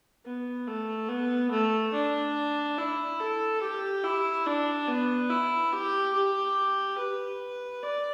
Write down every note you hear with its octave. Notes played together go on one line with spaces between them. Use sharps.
B3
A3
B3
A3
D4
E4
A4
G4
E4
D4
B3
E4
G4
G4
B4
D5